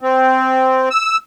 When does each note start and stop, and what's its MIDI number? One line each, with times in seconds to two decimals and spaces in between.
0.01 0.89 60
0.91 1.17 88